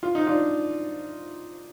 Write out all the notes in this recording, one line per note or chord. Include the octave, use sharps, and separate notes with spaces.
F4
D#4
D4 F4